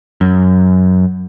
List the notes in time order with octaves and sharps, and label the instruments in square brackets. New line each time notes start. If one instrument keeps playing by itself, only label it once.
[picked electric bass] F#2